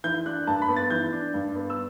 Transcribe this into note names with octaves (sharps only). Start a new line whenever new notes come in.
E3 G6
D4 F#6
G2 A5
B5
B3
A6
E3 G6
D4
G2
B3
E6